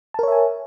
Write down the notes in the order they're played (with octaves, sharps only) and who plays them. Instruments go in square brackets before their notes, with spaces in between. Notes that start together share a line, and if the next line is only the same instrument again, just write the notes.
[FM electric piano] A5
A#4
C#5
E5
G#5